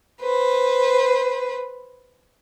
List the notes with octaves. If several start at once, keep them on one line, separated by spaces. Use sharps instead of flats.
B4 C5